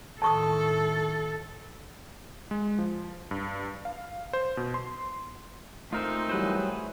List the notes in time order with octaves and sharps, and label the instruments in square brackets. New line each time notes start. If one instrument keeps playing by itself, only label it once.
[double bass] A2 D#3 [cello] A4 [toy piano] A5 C#6 D#6
[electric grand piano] G#3
F3
G2
F5
C5
B2
C6
[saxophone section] A#2 C4 D#4 [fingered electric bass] A3 [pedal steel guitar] F4 A#4 C5
[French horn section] E3 F#3 G3 [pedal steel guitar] G#4 B4 C5